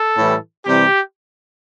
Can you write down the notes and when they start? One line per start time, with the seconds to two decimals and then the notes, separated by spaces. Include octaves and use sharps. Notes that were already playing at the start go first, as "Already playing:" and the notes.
Already playing: A4
0.17 A2 E3 G3
0.66 C3 E3 G3 G4